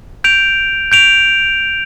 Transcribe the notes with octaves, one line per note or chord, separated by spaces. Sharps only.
G6 D7 F7
G6 D7 F7